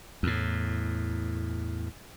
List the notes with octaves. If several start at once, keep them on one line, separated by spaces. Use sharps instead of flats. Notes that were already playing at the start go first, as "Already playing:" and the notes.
E2 A2